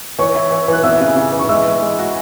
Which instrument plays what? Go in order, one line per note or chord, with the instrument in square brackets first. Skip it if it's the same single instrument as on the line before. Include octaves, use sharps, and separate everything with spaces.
[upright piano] E3 [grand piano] C#5 C#6
[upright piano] E4
E3
[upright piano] E3 [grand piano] F#6
[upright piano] B3 [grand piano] E5 E6
[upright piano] C#3
C#3
E3
[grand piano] C#6
[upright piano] G#3 [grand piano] E5 E6
[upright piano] E3
G#3
F#4